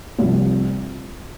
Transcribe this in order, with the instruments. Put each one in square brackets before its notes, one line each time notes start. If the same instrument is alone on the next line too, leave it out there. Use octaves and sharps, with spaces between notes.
[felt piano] C2 C3 F3